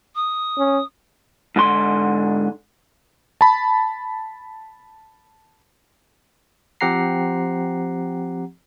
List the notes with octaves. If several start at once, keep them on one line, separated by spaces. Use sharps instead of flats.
D#6
C#4
G#2 D3 C6
A5 B5
F3 C4 G4 F#5 A#5 C7